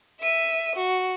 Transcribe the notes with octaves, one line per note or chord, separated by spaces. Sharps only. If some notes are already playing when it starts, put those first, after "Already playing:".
E5 D#7
F#4